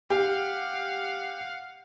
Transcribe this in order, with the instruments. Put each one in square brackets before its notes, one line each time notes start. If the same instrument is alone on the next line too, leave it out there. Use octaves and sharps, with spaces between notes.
[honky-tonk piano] G4 [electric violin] F5 F#5